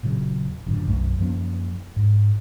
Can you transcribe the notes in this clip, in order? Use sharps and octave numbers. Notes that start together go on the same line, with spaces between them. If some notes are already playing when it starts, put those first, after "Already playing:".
D#1 A#2 C#3 F#3
F#1 F#2 A2 D3
B1 F#2 A3
F#2 F3 A#3 C#4
G#2